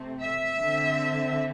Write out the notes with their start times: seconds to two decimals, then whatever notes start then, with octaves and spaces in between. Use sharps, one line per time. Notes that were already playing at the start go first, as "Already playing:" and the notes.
Already playing: C3 A3 C4
0.22 E5
0.59 D3 C4